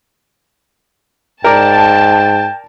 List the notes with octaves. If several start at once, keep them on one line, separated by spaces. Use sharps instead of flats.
G#2 A#4 D5 G5 A5